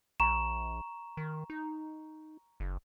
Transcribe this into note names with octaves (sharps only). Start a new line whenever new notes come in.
A#1 A#5 C#6 E7
D#3
D#4
F#1